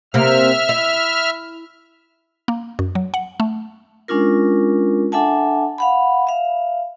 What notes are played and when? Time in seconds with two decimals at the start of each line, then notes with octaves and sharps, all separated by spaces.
0.14 C3 A#3 E5 F6
0.69 E4
2.48 A#3
2.79 F#2
2.95 F#3
3.14 F#5
3.40 A3
4.08 G#3 C#4 D4 F4 A#4
5.12 D4 A4 E5 F#5 G#5 A5
5.78 F5 F#5 B5
6.27 E5 F5